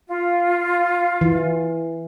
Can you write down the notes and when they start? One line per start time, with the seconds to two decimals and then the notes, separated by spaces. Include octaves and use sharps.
0.07 F4
1.21 E3